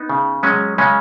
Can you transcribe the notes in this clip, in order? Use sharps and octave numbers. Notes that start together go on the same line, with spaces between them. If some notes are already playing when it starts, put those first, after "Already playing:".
Already playing: B3 D#4
C#3
F#3 G#3 C#4
C#3 G#3 C#4